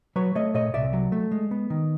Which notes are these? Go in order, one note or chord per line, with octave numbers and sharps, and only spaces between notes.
F#3 B4 C#5
A3 C#5 D#5
A#2 C#5 D#5
C2 D5 E5
F#3
A3
G#3
B3
D#3